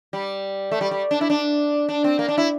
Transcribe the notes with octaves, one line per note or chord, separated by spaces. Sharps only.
G3
A3
G3
G3
D4
E4
D4
D4
C4
A#3
D4
E4